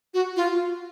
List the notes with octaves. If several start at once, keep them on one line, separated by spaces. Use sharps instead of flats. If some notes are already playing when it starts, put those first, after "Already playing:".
F#4
F4